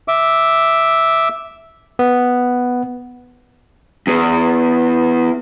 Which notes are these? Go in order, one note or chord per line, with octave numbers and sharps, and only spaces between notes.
E5 D6
B3
E2